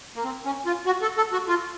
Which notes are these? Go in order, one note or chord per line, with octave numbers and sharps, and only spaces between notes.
A#3
C4
C#4
F4
F#4
A4
A4
F#4
F4